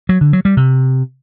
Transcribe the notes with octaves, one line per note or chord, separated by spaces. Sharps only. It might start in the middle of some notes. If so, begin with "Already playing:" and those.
F#3
D3
F#3
G3
C3